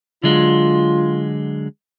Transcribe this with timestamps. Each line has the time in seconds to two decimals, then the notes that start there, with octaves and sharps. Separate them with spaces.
0.23 D3 F#3 G#3 F4